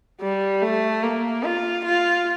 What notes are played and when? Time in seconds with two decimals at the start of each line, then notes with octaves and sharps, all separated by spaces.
0.21 G3
0.62 A3
1.03 A#3
1.44 F4
1.85 F4